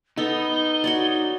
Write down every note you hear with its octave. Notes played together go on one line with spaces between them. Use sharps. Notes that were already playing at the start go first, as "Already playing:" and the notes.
B3 D#4 A4 G7
F#4 C#5 D5